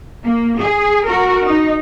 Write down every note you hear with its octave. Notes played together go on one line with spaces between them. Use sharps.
A#3
G#4
F#4 A#4
D#4